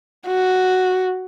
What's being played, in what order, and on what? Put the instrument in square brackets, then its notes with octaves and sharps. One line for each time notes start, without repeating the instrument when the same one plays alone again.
[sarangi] F#4